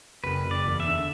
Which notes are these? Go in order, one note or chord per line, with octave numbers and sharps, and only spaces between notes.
F#1 B4
F#1
D5
E2
E5
D3